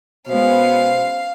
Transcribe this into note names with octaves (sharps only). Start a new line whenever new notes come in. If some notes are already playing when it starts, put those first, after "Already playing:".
B2 G#3 B3 C#4 C5 F5